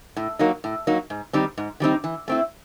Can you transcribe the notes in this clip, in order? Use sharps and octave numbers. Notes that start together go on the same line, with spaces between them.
A2
F#3 A#3 D#4
A2
F#3 A#3 D#4
G#2
D#3 G3 C4 D#4
G#2
D#3 G3 C4 D#4
E3
A3 C4 E4